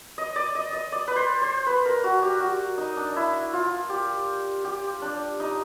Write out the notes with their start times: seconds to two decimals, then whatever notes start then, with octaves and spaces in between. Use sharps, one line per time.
0.18 D#5
0.36 D5
0.55 D#5
0.73 D#5
0.92 D5
1.08 B4
1.16 C5
1.42 C5
1.66 B4
1.86 A#4
2.04 F#4
2.22 G4
2.41 F#4
2.78 D#4
2.97 D4
3.16 E4
3.53 F4
3.90 G4
4.64 G4
5.02 D4
5.40 D#4